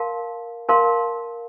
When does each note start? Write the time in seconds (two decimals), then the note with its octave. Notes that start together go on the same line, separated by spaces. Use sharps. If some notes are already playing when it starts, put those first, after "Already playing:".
Already playing: A#4 F5 A5 C6
0.69 A#4 F5 A5 C6